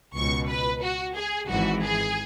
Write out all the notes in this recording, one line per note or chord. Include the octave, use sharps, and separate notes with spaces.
C#2 B2 C#6
B4
F#4
G#4
G#1 G#2 E3 F#4
G#4